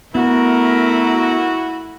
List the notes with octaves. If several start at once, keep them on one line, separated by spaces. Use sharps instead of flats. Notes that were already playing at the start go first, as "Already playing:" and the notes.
A3 B3 E4 F#4 A#4